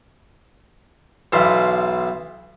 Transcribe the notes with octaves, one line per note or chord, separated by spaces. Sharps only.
B1 B2 E3 C5 D5 F5